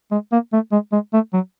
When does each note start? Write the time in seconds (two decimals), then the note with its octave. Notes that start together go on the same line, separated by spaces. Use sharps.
0.12 G#3
0.32 A#3
0.53 A3
0.72 G#3
0.93 G#3
1.13 A3
1.34 F#3